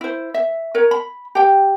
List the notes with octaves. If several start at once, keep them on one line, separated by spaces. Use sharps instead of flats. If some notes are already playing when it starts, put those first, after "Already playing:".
E4 C5
E5
A#4 C#5
B5
G4 G5